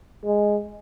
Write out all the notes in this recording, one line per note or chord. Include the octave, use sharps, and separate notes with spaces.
G#3